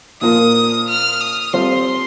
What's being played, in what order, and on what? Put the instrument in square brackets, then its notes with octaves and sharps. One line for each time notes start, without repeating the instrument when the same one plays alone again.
[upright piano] A#2 F3 A#3 F4 A#4 [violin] D#6
[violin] F6
D#6
[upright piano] G3 C4 F4 A4 [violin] C6